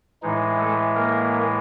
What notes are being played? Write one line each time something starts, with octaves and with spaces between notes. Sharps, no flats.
A2 E3 G#3 D#4
A3 A4
A#3 A#4